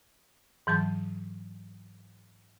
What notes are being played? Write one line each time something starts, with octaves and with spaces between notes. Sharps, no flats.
G#2 E3 F#3 A5